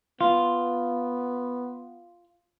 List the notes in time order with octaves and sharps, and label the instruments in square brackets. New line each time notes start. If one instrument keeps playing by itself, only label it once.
[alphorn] B3 [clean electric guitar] F4